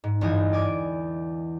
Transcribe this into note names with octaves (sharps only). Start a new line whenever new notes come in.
G#2
G1 E2 G2 E3 D#5 G#5
D5 G#5 D6